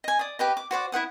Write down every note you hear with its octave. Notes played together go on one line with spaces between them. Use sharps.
D#5 G#5
D5 D#6
G4 B4 D#5
D6
F#4 C5 D5 F#5
E4 C5 F#5 D#6